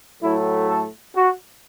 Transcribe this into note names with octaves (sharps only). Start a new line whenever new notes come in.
A2 F#3 A3 E4
A4
F#4